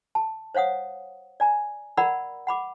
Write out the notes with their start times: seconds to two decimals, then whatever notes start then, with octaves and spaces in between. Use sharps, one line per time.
0.15 A5
0.55 C5 C#5 F5 F#5 D#6
1.40 D5 G#5 A#5
1.97 A#4 D5 F#5 A#5 B5 E6
2.47 F#5 B5 D6